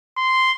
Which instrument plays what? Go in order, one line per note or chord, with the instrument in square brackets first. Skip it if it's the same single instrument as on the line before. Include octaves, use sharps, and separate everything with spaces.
[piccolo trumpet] C6